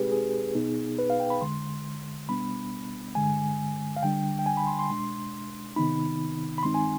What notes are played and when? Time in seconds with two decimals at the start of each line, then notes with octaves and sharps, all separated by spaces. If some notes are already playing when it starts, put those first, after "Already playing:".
Already playing: B2 G#3 C4 D#4 G4 G#4 B4
0.12 G#4
0.55 B2 B3 D#4
0.99 B4
1.10 F5
1.20 G5
1.30 B5
1.41 F2 D3 G#3 C6
2.29 B2 G3 B3 D4 B5
3.15 G2 D3 G#3 G#5
3.96 F5
4.03 D3 G3 D4 G5
4.39 G5
4.46 G#5
4.57 B5
4.67 C6
4.79 C6
4.89 B2 G#3 D4 C6
5.76 C3 D#3 B3 D#4 B5
6.58 B5
6.63 G2 D#3 G#3 C4 D#4 C6
6.74 G#5